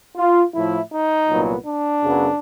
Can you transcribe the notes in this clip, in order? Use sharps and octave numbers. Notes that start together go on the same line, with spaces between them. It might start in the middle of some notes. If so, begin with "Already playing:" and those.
F4
A2 F3 A3 E4
D#4
C2 A#2 F#3 B3
D4
F#2 C#3 F#3 B3